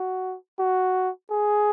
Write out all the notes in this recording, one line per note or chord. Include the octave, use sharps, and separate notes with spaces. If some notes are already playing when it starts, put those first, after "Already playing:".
Already playing: F#4
F#4
G#4